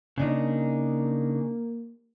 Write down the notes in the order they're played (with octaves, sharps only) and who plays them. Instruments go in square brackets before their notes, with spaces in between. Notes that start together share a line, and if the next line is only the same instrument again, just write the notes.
[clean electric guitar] C#3 D4 D#4 [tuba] A#3